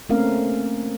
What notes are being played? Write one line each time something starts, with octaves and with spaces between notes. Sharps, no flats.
A3 A#3 C4 C#4 A#4 F5